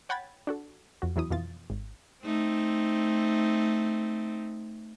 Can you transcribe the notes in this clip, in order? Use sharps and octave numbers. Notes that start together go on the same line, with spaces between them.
C#5 F#5 G5 B5 G#6 A6
D4 F#4 A4
F2 F#4
E2 E3 F#3 E4 D#6
F2 B2 E3 F4 A6
G#1
A3 C4 D#4